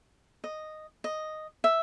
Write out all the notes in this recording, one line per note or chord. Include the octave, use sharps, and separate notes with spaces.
D#5
D#5
E5